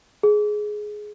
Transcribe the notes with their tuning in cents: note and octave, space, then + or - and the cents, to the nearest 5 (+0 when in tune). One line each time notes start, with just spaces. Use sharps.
G#4 +15